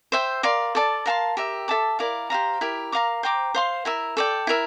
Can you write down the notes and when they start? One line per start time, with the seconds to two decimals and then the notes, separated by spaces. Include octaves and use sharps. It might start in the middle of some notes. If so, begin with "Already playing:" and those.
0.12 C5 E5 G5
0.43 A#4 D5 F5 C6
0.75 A4 D5 A5
1.06 A#4 F5 A5 C6
1.37 G4 A#4 E5
1.68 A4 E5 A5 D6
1.99 E4 A#4 D5 F5
2.30 G4 C5 F5 A#5
2.61 E4 G4 A#4
2.92 A#4 F5 A#5 D6
3.23 C5 G5 A#5 D6
3.54 C5 F5 C6
3.85 E4 A#4 E5
4.17 A4 D5 G5
4.47 E4 A#4 E5